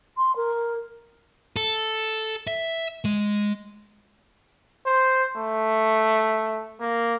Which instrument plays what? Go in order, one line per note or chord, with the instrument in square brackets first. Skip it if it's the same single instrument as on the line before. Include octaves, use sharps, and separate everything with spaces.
[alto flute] C6
A#4
[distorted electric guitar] A4
E5
G#3
[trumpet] C5
A3
A#3